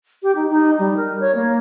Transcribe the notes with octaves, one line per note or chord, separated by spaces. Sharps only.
G4
D#4
D#4
G3
A#4
C#5
A#3